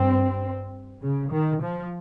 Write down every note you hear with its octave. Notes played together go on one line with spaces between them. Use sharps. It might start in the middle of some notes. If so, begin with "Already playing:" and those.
Already playing: G2 C4
C#3
D#3
F3